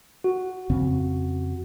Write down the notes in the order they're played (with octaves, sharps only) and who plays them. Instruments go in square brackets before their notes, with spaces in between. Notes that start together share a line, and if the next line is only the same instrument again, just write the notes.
[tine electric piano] F#4
[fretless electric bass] F2 C#3 C4